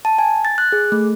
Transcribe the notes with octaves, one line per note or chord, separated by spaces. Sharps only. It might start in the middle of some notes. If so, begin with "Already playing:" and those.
A5
G#5
A6
F#6
G#4
A3